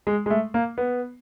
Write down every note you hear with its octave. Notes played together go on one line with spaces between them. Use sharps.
G#3
G#3
A3
A#3
B3